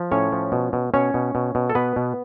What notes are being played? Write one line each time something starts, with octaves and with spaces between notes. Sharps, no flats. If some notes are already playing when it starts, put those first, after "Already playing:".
Already playing: F3
A2 C#4 C#5
F3
B2
B2
B2 C#4 C#5
B2
B2
B2
A4
B2 B3 B4
B2